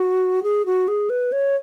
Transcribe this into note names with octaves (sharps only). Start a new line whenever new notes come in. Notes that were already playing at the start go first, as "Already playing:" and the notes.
Already playing: F#4
G#4
F#4
G#4
B4
C#5